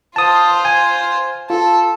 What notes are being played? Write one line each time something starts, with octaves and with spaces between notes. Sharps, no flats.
F4 C5 A5 D#6
G#5
F4 A4